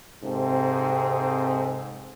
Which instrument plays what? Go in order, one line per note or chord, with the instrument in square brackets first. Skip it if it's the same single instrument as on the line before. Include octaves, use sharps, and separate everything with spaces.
[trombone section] G#2 C3 C4 A4